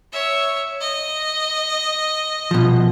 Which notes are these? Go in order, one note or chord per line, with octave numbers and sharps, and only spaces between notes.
C#5 E5
D#5
B2 F3